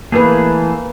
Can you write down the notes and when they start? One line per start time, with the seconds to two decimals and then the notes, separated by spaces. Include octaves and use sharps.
0.12 E3 A3 A#3 G#4 B4